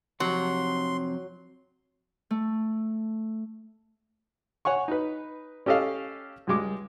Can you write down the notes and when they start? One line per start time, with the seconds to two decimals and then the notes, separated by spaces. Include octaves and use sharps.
0.20 F2 C3 F#3 C6
2.31 A3
4.65 C#5 F#5 G#5 C#6
4.88 D#4 B4
5.66 C#4 G4 A4 D#5 F5
6.47 C#2 G3 G#3 D6